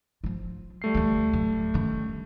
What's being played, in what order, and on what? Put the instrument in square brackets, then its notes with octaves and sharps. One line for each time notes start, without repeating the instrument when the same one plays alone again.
[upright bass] F3 F4
[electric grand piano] G3 A3 C7
[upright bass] D2 E3
D1
D#3 C#4